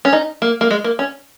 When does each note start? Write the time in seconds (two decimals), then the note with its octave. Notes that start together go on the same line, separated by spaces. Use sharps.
0.05 C#4
0.13 D#4
0.42 A#3
0.61 A#3
0.71 G#3
0.84 A#3
0.99 C#4